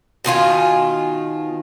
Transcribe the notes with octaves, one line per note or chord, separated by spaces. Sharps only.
B2 D#3 F4 G#5